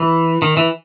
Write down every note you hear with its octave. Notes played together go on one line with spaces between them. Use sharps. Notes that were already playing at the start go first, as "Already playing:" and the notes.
Already playing: E3
D#3
E3